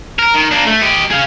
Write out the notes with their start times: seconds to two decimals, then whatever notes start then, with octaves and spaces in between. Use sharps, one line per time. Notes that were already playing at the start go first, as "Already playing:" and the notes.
0.19 A#4
0.34 D#3
0.51 A#3 D4
0.66 A3
0.81 G4 D#5
1.10 G#4 F5